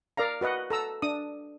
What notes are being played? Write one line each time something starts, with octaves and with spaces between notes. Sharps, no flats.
A#4 D5 F5 A#5
F#4 B4 D#5 F#5
A4 A#5 E6
D4 D#6